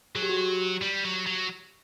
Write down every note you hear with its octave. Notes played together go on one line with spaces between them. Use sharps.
F#3 G#4
G4
F#4
G4
G3
F#3
F#3